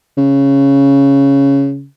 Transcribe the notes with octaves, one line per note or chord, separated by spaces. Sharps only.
C#3